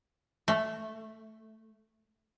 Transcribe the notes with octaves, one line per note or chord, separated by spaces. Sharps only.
A3